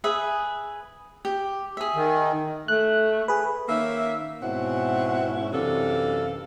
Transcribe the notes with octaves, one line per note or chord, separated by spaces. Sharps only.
G#4 B4 E5
G4
G#4 E5
D#3
A3 F#6
G#4 B4
D#3 A#3 C#4 E5
G#2 B2 C4 C#4 E4 F#5
F#2 C3 E3 D4 A4 F5